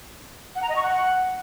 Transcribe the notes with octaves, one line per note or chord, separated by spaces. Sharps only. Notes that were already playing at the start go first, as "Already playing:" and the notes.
F#5
A#5
D#5
C#6
F#5